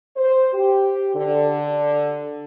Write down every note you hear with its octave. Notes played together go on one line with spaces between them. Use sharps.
C5
G4
D3